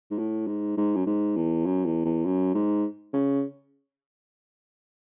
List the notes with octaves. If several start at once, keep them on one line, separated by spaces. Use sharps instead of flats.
G#2
A2
G#2
G#2
F#2
G#2
E2
F#2
E2
E2
F#2
G#2
C#3